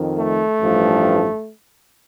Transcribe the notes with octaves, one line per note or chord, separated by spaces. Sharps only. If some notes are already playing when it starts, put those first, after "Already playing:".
Already playing: F2 D#3
A3
A1 G2 F3